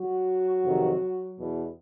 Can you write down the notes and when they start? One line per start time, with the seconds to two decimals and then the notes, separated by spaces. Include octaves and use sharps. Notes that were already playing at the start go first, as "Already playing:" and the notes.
Already playing: F#3 F#4
0.65 F2 C3 D#3
1.37 E2 B2